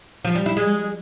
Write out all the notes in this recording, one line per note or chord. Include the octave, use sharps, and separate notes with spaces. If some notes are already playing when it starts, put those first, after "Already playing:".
F3
G3
E4
G#3